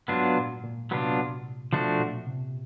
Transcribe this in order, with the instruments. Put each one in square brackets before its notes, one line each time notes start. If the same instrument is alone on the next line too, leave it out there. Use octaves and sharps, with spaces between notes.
[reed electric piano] G#2 [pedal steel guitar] F#3 B3 D4 F4
[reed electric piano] A#2
A#2
[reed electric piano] C3 [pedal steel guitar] F#3 B3 D4 F4
[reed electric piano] B2 [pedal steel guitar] F3 A3 D4 F#4
[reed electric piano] A#2
C3